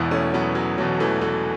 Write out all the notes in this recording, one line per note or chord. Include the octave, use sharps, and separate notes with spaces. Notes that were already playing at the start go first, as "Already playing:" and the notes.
Already playing: E1 E2 B2 B3 E4
A3 C#4
F#3 B3
F#3
E1 E2 B2 F#3
E3 A3
E3 A3